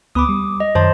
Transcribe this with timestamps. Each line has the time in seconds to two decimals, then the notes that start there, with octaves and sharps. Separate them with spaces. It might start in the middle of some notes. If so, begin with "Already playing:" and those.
0.15 D2 B3 B5 D6 D#6
0.29 G3
0.60 D#5
0.75 F#2 D#3 C5 A5 C6